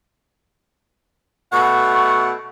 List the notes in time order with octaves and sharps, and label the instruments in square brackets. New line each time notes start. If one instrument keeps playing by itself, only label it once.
[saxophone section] B2 A3 F#5 [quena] C#6